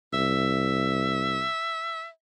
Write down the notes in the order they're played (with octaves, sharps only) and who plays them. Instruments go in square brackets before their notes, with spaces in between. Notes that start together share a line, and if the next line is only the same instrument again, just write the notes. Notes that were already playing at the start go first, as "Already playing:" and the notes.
[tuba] C2 [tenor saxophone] E5